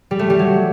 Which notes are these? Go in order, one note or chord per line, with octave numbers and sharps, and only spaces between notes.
G3
A3
G3
F#3